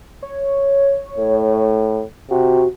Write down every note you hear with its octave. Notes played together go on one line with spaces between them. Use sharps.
C#5
A2
C3 F#4